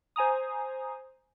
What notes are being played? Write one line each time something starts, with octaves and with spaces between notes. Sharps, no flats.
C5 G#5 A#5 D#6